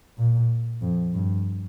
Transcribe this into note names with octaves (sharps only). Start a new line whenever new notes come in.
A#2
F2
G2